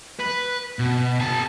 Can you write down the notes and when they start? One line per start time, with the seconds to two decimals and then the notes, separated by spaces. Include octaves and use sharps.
0.19 B4
0.79 B2
1.20 G#4 A5